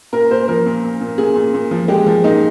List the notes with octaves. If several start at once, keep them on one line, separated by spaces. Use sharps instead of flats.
A#2 A#4
A#2 C5
F3 A#4
A#2
A#2
A#2
A#2 G#4
A#2
A#2
F3
G#3 G4
F3
A#2 D#4